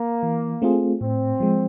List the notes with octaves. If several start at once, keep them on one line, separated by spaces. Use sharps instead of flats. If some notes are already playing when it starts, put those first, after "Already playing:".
Already playing: A#3
E3
A3 C4 F4 G#4
A2 C4
F3 G#3